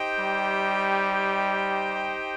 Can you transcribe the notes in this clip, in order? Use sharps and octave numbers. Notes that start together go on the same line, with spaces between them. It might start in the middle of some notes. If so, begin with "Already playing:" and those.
Already playing: D#4 G4 C5 D#5 G5
G3